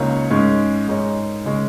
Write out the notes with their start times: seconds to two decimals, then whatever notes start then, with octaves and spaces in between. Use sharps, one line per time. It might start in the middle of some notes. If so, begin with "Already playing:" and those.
Already playing: C#2 C#3 A#3 D#4 C#5
0.31 G#2 G#3 C#4
0.87 G#2 G#3 D#4 A#4 C#5
1.45 C#3 G#3 C#4